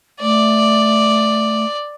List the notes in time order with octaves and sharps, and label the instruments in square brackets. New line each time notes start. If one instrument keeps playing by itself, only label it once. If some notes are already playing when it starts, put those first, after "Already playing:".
[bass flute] A3 [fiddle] D5